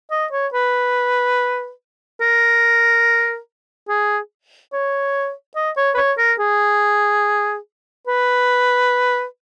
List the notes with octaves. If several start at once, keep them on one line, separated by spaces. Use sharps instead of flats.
D#5
C#5
B4
A#4
G#4
C#5
D#5
C#5
B4
C#5
A#4
G#4
B4